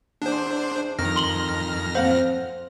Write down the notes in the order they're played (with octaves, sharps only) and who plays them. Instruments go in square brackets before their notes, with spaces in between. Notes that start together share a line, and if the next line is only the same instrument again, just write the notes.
[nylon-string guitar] E2 [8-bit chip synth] D4 C5
[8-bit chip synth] F2 F6 A#6 [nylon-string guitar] D#3
[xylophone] C6 F#7 G7
[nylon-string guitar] C4 F5 F#5 [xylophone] C5